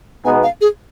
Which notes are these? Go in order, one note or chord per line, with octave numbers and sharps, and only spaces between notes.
B2 G#3 B3 D#4 G#5
F5
G#4